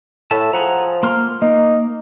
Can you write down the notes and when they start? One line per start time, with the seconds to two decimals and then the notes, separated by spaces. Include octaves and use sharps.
0.31 A2 E5 A5
0.53 F3 G#4 F#5 A#5
1.03 A#3 C6 F6
1.42 A#3 D#4